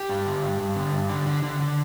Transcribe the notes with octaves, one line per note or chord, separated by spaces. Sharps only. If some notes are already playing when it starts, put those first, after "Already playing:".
Already playing: G4
G2
D3
G2
G2
D3
G2
D3
D3
D3
D3